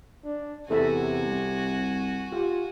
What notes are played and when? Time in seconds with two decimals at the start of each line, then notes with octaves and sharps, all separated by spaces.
0.25 D4
0.70 E2 C3 F#4 A4 E5 G#5
1.24 C2
2.32 F4 G4